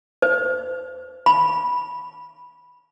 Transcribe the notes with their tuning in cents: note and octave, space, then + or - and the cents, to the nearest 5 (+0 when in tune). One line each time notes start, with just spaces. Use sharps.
C5 -35
B5 -10